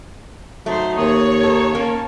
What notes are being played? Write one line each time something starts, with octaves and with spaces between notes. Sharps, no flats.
F#3 A3 D#4 C5
D#2 C#5 D#6
D#4 A4
A#3 C#4 A5